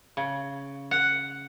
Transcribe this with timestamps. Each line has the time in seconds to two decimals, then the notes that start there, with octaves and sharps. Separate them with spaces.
0.17 C#3
0.91 F#5